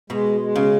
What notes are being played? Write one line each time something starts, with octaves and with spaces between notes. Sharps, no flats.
B2 G#3
G#3
C#3